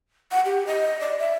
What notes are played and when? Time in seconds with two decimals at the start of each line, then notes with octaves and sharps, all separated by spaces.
0.31 F#5
0.45 G4
0.67 D#5
1.01 D5
1.19 E5